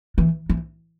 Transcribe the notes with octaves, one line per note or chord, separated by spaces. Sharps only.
E3
E3